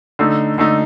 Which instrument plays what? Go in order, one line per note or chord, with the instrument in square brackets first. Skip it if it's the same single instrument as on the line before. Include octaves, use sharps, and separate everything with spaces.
[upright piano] D3 A3 D#4
D3 A3 D#4